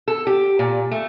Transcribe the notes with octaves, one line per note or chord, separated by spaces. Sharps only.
A4
G4
A#2
A3